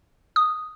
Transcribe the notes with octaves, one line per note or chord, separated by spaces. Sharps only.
D#6